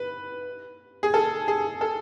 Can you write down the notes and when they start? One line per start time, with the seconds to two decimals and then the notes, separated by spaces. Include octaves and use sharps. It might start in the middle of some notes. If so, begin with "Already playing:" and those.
Already playing: B4
1.03 G#4
1.14 A4
1.48 G#4
1.81 A4